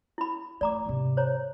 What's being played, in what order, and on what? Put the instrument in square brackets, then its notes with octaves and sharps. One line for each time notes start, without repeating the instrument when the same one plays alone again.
[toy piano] E4 B5
[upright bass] A3 [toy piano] D5 A#5 D6
[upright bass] G#2 C3
[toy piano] C5 C#5 A#5